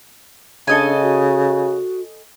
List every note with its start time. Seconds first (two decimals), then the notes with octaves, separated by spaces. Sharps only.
0.67 C#3 D4 A4 D#5 G#5
1.02 F#4